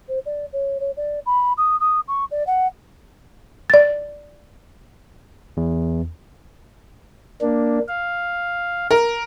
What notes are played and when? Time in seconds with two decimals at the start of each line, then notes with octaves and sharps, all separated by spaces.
0.09 C5
0.26 D5
0.53 C#5
0.80 C#5
0.97 D5
1.26 B5
1.58 D#6
1.80 D#6
2.08 C#6
2.31 D5
2.47 F#5
3.70 D5 A6
5.57 E2
7.41 A#3 D4
7.88 F5
8.91 A#4